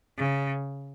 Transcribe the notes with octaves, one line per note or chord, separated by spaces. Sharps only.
C#3